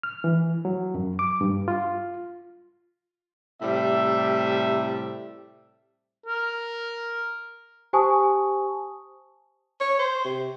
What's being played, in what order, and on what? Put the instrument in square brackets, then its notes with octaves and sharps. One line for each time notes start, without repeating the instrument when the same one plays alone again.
[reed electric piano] F6
E3
F#3
F#2
D6
G2
F4
[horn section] A2 C3 G3 E5
[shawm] A#4
[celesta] G4 C5 G#5 A5 C#6 D#6
[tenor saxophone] C#5
C5
C3